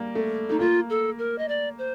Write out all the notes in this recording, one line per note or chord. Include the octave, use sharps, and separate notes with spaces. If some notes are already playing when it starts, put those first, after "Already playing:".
Already playing: G3 A#3
A3
A3 D#4
A#3 F4
A4
A#4
D#5
D5
C5